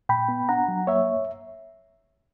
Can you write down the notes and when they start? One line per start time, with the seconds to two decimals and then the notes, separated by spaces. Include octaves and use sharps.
0.09 A#2 G5 B5
0.29 B3
0.49 D4 F#5 A#5
0.68 F#3
0.87 A#3 C#5 E5